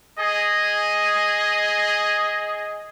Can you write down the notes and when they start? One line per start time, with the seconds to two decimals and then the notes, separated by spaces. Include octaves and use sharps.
0.18 G#4 D#5